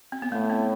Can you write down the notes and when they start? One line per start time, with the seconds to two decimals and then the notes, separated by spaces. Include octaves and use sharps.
0.12 C4
0.22 B3
0.32 A2 A3
0.50 C4